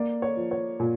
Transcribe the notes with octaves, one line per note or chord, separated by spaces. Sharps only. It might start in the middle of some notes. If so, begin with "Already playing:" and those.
Already playing: A#3 D5
C#5
F3
C#5
A#2